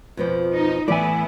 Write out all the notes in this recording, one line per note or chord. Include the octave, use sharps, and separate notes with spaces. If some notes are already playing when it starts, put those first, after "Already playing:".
F2 B2 F3
D#4
A2 E3 B3 E4 D5 G#5